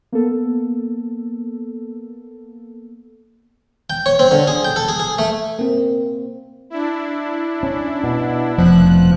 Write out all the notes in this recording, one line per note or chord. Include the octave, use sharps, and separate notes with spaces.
A#3 B3 A4
G5
C#5
C4
D3
G#4
G5
A4
G#4
G#4
A3
A#3 C4
D4 E4
C#4
B2
F1 B2 F3 F#6